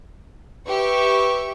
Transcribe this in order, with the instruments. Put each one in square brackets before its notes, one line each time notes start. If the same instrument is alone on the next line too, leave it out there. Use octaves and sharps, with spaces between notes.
[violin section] G4 E5 C#6 [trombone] B4